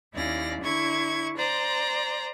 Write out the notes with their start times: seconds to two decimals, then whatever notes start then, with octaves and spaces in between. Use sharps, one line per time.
0.15 D#2 C#4 E4 D5 F5 A#6
0.60 D3 E4 C#6 G#6
1.36 C5 D5 A#5 C6